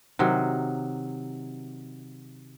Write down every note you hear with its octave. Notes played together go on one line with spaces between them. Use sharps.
C3 D#3 F#3